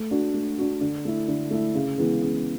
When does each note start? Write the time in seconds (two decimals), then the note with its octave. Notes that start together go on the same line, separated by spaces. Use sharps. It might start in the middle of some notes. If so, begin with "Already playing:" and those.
Already playing: A3
0.11 D4 F#4
0.34 A3
0.58 D4 F#4
0.81 D3
1.05 A3 E4
1.28 D3
1.51 A3 E4
1.75 C#3
1.98 E3 G#3 B3
2.22 C#3